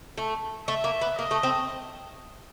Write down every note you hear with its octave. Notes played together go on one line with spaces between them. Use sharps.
A3
A3 E5
A#3
B3
A#3 D#5
A3
C4